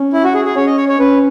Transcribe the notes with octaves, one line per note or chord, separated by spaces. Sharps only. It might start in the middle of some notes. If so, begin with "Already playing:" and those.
Already playing: C#4
E4
F#4
G#4
G#4
C#4 C#5
D#5
C#5
C#5
C#4 B4